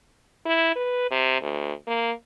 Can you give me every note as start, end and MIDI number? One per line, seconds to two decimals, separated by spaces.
0.46 0.72 64
0.75 1.06 71
1.11 1.41 48
1.41 1.73 38
1.87 2.11 58